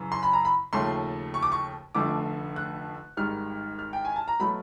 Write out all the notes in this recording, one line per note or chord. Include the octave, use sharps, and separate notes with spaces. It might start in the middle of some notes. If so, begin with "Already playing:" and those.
Already playing: F#2 C#3 E3
C6
B5
A#5
B5
D#2 C#3 F3 A3 C6
C#6
D6
C#6
F1 F2 D3 F3 A3 D6
F#6
G#1 G#2 D#3 G3 F6
F6
G5
G#5
A5
A#5
B2 F#3 A3 B5